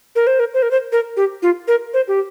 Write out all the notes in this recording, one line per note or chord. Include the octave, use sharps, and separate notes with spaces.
A#4
C5
A#4
C5
A#4
C5
A#4
G4
F4
A#4
C5
G4